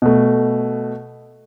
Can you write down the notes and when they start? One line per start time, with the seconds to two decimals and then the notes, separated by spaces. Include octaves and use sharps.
0.02 B2 A3